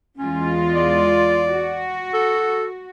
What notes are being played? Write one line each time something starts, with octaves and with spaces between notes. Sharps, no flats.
E2 G#3 C#4 F4
D5
F#4
A4